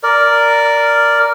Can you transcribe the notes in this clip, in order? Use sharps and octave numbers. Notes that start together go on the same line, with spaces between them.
A#4 D5